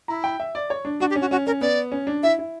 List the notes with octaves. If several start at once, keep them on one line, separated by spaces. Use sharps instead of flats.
E4 A#5
G5
E5
D5
C#5
D4
D4 F#4
G4
C#4
F#4
C#4 F#4
C#4 A#4
B3 D5
C#4
D4
E4 E5
E4